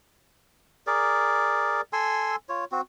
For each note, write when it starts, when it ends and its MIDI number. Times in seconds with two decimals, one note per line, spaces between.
0.87 1.81 68
0.87 1.81 70
0.87 1.81 74
1.93 2.36 69
1.93 2.36 80
1.93 2.36 84
1.93 2.36 88
2.49 2.65 65
2.49 2.65 73
2.72 2.81 60
2.72 2.81 66